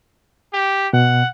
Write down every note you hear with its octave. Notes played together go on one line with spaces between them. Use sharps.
G4
B2 F#5